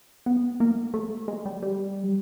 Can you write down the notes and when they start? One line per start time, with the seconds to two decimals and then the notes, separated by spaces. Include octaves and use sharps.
0.26 B3
0.60 A#3
0.94 A3
1.28 G#3
1.45 G3
1.63 G3